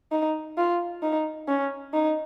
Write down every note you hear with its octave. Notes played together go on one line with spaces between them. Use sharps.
D#4
F4
D#4
C#4
D#4